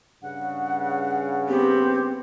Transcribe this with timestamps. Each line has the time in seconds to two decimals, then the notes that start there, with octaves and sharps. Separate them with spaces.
0.22 G2 C#3 F#5
1.49 B3 C4 G4